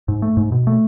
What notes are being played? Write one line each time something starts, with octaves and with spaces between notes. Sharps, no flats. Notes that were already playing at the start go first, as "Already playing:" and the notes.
G#2
A3
G#2
B2
A3